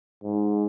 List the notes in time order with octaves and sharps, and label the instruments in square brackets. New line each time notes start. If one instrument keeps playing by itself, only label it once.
[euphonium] G#2